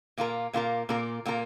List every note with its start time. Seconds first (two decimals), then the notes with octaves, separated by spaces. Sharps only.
0.17 A#2 A#3 F4 A#4
0.53 A#2 A#3 F4 A#4
0.89 A#2 A#3 F4 A#4
1.26 A#2 A#3 F4 A#4